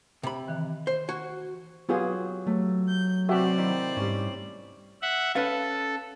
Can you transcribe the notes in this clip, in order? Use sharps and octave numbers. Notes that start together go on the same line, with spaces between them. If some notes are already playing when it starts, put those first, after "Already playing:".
C3 B5
D#3 E3 F#6
C5
F#4 G#6
F#3 B3 F4 G4 G#4 D#6
F#3 A3
G6
C3 C4 F#4 G4 D5 E5
D#3 E4
G#2 G3 C#4
E5 F#5
C#4 A4 B4 F5